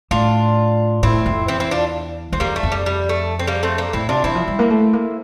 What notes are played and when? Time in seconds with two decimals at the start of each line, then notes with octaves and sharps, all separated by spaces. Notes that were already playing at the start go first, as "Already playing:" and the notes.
0.11 A2 D4 F4
1.03 A2 C4 E4
1.26 F2
1.48 E2 C4 E4
1.60 C4 E4
1.71 D4 F4
2.32 E2 C4
2.40 F2 G3 A#3
2.56 A3
2.63 F2
2.72 G3
2.86 G3
3.09 A3
3.39 C4
3.47 G3 A#3
3.63 A3 C4
3.78 A#3 D4
3.93 A2 C4 E4
4.09 C3 D4 F4
4.24 E3 C4 E4
4.35 F3
4.48 G3
4.59 A#3
4.70 A3
4.93 A#3